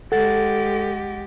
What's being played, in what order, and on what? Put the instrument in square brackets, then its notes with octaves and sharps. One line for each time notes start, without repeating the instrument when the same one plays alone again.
[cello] G#3 G4 [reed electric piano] A4 [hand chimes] F#5 A6